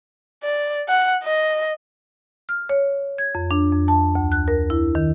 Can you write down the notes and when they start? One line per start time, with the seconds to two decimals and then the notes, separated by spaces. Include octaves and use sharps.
0.43 D5
0.89 F#5
1.24 D#5
2.49 F6
2.69 C#5
3.18 G#6
3.35 F2
3.51 D4
3.72 F2
3.88 A5
4.15 D2
4.32 F#6
4.48 A#4
4.70 E4
4.95 D#3